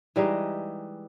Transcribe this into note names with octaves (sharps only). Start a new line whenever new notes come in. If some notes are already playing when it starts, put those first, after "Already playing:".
E3 G3 G#3 D#4